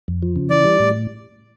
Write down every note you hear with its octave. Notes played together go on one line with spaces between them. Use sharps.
F2
F3
C#3
E3 D5
G3
A2